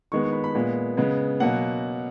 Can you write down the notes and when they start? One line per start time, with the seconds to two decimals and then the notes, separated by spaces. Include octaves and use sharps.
0.12 D#3 G#3 B3 C#6
0.24 C#6
0.33 B5
0.44 B5
0.55 A#2 G#3 B3
0.97 C#3 G#3 B3
1.40 B2 F#3 A#3 F#5